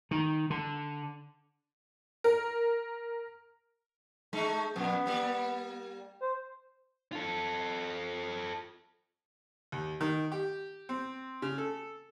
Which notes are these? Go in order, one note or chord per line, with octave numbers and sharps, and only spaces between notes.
D#3
D3
A#4
G#3 A3 D#4
F2 A#2 B3
G3 A#3 D5
C5
F4 A4
D#2
D#3
G4
C4
C#3
A4